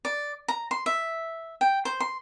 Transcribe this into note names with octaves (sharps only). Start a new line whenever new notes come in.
D5
A#5
C6
E5
G5
C5
C6